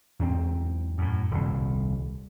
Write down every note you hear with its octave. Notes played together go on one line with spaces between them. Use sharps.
E2 G#2 B3 C4
F#2 A2
D#1 C2